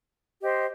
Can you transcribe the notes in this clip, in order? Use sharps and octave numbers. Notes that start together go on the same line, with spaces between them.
G4 C5 D#5